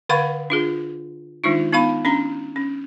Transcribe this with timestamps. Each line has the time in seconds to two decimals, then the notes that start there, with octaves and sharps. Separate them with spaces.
0.09 D3 B4 F5 F#5 B5 C#6
0.50 D4 F4 G#4
1.44 D#3 G#3 D4 D#4 F4
1.73 B3 D#4 F5 B5
2.05 C#4 D4 A#5
2.56 C#4